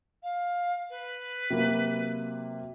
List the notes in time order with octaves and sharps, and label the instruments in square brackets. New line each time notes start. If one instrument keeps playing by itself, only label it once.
[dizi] F5
B4
[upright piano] C3 F#3 A#3